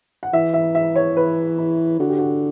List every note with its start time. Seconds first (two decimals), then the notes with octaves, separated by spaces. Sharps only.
0.23 F#5
0.33 E3 E5
0.54 E5
0.75 E5
0.96 C#5
1.17 B4
1.59 E4
1.99 D3 F#4
2.09 G4
2.18 F#4